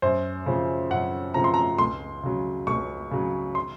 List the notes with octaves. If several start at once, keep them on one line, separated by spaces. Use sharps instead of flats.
F#2 C5
C#3 F3 C4
F#2 F#5
C#3 F3 C4 A#5
C6
A#5
C#2 C6
C#3 F#3
C#2 C#6
C#3 F#3
C6